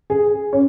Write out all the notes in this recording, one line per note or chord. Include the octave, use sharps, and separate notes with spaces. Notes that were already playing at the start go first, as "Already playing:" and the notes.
G#4
C#4